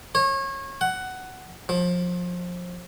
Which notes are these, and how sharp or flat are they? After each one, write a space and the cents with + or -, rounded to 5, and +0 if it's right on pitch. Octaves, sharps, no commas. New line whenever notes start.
C#5 -30
F#5 +10
F3 +30